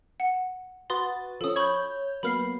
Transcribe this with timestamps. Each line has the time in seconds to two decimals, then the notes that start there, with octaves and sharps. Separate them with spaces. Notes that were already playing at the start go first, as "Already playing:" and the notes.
0.20 F#5
0.90 F#4 B4 C6 D#6 A6
1.41 F3 C#4 A4 D#6
1.56 C#5 B5 C#6 G6 G#6
2.23 F#3 A#3 B3 B5 F6 C7